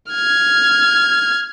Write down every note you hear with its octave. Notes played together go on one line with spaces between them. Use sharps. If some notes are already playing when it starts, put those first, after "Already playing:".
F6 G#6